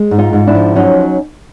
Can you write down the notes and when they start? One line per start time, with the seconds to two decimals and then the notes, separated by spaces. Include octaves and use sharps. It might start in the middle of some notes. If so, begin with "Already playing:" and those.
Already playing: G#3
0.11 G#2
0.18 D#4 F4
0.33 G#2
0.47 D4 E4
0.55 F3
0.76 F#3 C#4 D#4